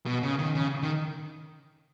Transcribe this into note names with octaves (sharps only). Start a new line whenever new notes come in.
B2
C#3
D#3
C#3
D#3